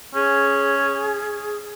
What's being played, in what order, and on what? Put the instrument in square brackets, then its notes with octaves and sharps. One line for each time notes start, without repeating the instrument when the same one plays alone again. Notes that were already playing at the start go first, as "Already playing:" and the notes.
[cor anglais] C#4 [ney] G#4